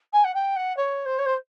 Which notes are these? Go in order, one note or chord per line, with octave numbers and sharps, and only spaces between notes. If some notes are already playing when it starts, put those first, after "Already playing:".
G#5
F#5
G5
F#5
C#5
C5
C#5
C5